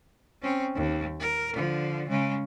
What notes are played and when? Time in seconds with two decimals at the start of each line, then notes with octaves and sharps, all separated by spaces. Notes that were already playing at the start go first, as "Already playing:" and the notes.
0.42 C4 C#4
0.75 D#2
1.20 A#4
1.54 D3 F3
2.09 C#3 G#3